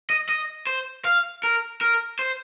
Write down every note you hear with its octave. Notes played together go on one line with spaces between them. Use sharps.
D#5
D#5
C5
F5
A#4
A#4
C5